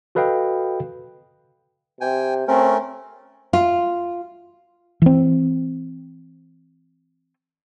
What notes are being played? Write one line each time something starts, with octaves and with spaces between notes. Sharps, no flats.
F#4 A4 B4 D#5 F5 G5
C3 G5 G#5
A3 C4 C#4 A#4
F4
E3 C4